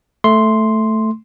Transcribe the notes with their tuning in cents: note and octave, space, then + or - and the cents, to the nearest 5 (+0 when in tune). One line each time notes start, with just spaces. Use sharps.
A3 +0 C6 +0